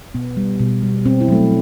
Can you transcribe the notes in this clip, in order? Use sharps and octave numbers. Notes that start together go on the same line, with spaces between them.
B2 B3
G3
B2
G3
B2 C4
E4
F#3 A3